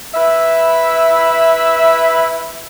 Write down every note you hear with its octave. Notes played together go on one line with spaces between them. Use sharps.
E4 B4 E5